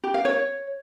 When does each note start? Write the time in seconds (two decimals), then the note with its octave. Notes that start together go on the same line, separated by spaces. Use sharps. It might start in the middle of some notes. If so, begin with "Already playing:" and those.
0.04 G4
0.14 F5
0.25 C#5